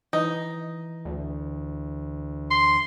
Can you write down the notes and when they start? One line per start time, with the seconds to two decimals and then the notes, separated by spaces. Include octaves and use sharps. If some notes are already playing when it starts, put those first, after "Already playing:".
0.13 E3 D#4
1.05 D2
2.51 C6